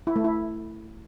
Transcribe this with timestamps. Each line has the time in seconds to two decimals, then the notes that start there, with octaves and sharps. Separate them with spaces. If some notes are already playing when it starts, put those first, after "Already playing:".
0.07 E4
0.16 A3
0.24 E4